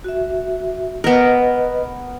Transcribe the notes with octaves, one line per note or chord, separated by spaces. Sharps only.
F#4 E5
B3 A#4 B4 D#5